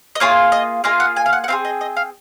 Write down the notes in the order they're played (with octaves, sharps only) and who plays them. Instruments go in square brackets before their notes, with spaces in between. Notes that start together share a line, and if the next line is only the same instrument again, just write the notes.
[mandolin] D#5
A#3 F4 G#4 C#5
D#5
A#3 F4 G#4 D#5
F#5
G#5
F5
F#5
F#5
C4 F4 G#4 F5
D#5
D#5
F5